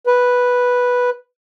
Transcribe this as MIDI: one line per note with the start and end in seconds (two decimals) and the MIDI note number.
0.07 1.10 71